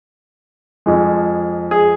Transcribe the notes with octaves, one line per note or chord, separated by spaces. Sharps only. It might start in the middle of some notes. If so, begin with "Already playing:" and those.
F2 F3 G#3
G#4